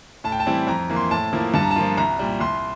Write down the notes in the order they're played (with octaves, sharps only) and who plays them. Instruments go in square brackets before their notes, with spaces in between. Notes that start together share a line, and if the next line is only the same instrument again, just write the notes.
[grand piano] A2 A5
G5
A5
E3 G3 C4 E4
F2 A#5
E3 A#3
C6
A2 A5
F3 A#3 E4
G2 A5
A#5
A5
F3 A#3 F4
C2 A#5
A#2 G3
C2 C6